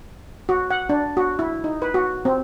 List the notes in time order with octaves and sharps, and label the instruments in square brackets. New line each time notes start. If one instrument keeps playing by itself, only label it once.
[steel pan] F#4
F#5
D4
F#4
E4
D#4
B4
F#4
C4